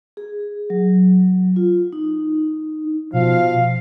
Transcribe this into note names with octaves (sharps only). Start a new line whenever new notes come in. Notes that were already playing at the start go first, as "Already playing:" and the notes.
G#4
F#3
F4
D#4
B2 F3 F5